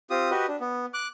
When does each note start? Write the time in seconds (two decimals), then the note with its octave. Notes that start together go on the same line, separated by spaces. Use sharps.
0.10 C4 F4 G4 D#6
0.31 F#4 G4 B4 D#5
0.48 D4
0.61 B3
0.94 D6 F#6